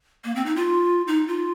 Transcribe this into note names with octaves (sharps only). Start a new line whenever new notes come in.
A#3
C4
D#4
F4
D#4
F4